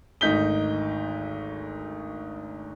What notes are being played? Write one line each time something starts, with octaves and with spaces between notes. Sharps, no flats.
G#1 D2 D#4 G6 B6 G7